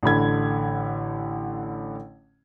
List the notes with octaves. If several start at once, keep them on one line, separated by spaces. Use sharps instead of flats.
A1 D3 B5 G#6